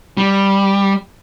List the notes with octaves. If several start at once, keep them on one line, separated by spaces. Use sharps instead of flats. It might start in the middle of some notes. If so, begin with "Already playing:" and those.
G3